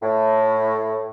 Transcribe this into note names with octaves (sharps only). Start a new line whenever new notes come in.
A2